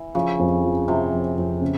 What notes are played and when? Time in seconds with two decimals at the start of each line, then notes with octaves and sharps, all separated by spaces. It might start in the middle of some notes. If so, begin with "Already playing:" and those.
Already playing: E3
0.15 C#3 F3
0.39 F2
0.64 F3
0.88 C3 F3
1.12 F2
1.38 F2
1.62 C#3